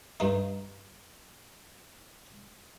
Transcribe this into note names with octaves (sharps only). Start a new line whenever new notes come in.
G2 D#4